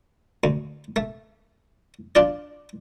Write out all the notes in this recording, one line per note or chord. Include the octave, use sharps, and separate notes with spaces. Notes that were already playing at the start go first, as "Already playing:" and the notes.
D2
A3
D4 F4 D5